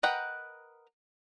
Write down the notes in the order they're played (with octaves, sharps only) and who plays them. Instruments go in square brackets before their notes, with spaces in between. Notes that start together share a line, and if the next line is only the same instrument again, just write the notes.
[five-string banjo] A#4 B4 D#5 F#5 G5